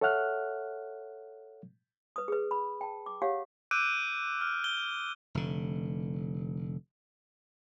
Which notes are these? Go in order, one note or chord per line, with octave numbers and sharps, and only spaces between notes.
A4 C#5 E5 F#5 F6 F#6
B4 D#6
G#4 B4
B5
G5 A5
D6
G4 C#5 F5 F#5
D6 E6 F#6 G6 D7 D#7
F6
G6 G7
F1 D3